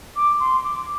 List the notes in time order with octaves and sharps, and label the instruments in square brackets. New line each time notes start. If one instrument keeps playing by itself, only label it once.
[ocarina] D6
C6
D6